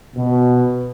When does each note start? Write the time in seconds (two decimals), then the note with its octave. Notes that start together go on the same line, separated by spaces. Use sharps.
0.15 B2